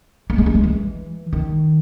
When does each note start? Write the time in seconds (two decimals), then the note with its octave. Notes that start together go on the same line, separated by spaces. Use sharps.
0.30 A#3
0.38 G#3
0.46 A#3
0.55 G#3
0.64 E3
1.33 D#3